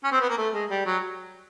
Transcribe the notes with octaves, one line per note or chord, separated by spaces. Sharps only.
C#4
C4
B3
A#3
A3
G#3
G3
F#3